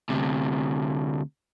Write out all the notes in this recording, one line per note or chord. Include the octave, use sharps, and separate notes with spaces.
D2 C3